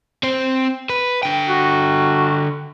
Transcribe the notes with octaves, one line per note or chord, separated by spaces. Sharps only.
C4 C5
B4
D3 G5
F#4